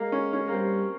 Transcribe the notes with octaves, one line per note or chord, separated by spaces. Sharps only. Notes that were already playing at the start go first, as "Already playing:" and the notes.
Already playing: G#3 A#3
C#4
C#4
A#3
G3 C4